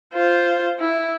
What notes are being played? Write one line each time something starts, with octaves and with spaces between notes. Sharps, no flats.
F4 C5
E4